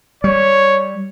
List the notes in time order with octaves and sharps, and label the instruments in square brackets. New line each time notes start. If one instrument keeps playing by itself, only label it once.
[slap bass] G3 [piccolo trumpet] C#5